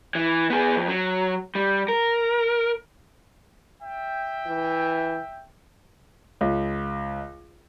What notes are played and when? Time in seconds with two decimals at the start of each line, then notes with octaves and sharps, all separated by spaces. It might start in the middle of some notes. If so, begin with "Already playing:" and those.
0.15 E3
0.50 B3 G#4
0.76 F2
0.88 F#3
1.55 G3
1.89 A#4
3.82 E5 G5
4.47 E3
6.41 C#2